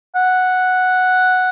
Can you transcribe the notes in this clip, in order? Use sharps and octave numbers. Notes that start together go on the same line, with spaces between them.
F#5